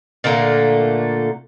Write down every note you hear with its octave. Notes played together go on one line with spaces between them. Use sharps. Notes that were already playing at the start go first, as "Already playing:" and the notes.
A#2 D3 A3 A#3